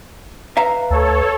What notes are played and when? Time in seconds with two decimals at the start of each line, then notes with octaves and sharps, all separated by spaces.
0.57 B4 E5 F5 A#5
0.90 D2 A4 C#5